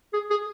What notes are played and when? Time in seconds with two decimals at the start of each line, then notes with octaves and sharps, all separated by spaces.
0.13 G#4
0.30 G#4